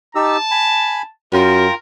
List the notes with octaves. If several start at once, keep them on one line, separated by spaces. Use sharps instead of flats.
D#4 G4 A5 E6
G#5 B5
F#2 F4 A#4 G5